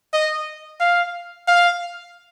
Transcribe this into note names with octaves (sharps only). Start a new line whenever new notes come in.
D#5
F5
F5